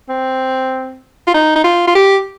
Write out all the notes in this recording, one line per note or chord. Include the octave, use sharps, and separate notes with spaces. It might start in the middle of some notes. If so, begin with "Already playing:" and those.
C4
F4
D#4
D#4
F4
F4
G4